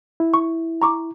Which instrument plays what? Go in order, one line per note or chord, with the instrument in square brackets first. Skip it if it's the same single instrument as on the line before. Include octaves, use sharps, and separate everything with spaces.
[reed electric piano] E4
[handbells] C#6
A#5 C#6 D6